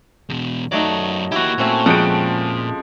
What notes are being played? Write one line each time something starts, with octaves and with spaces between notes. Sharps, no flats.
E2 B2
F#2 F#3 A3 D#4 D5
A#3 E4 F#4 G4
A#2 A3 C4 C#4
F2 F3 G#3 F#5 G5 D7